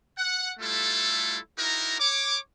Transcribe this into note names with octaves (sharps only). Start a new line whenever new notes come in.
F#5
G3 A3 E4 F4 A4
D#4 E4 F#4 A#4
C#5 D6